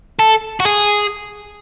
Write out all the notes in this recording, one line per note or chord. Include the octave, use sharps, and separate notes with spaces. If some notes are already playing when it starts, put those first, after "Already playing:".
A4
F#4
G#4